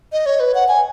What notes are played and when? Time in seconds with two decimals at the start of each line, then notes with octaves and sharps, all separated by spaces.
0.12 D#5
0.26 C#5
0.40 B4
0.55 F#5
0.68 G#5